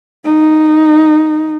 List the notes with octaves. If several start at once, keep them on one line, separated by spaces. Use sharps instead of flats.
D#4